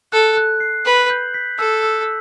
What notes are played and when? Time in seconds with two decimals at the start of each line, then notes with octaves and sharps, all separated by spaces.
0.12 A4 F#6
0.37 F#6
0.60 C7
0.85 B4 F#7
1.10 G6
1.34 B6
1.58 A4 E6
1.83 E6